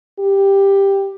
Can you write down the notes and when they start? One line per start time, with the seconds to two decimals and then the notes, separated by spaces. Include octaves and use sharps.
0.20 G4